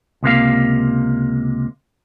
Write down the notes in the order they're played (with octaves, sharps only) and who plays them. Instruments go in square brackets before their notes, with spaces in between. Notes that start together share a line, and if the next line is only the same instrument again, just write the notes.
[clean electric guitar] C#2 C3 A#3 F5